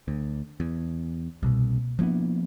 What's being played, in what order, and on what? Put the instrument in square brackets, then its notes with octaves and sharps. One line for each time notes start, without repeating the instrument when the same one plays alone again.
[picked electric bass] D2
E2
[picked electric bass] C2 [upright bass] B2 A#3
[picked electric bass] F3 A#3 B3 [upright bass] D4 E4